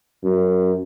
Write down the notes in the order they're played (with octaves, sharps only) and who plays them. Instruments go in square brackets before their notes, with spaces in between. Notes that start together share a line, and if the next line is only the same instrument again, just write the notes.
[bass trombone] F#2